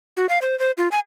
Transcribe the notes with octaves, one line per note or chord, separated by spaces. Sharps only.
F#4
F5
C5
C5
F4
G#5